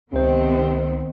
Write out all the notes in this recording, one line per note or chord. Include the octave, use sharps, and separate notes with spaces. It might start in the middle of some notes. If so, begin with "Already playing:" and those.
C#2 C3 D#3 B3 C4 C5